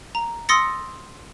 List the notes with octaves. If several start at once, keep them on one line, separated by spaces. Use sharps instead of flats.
A#5
C6 D#6 E6 A6 A#6 C#7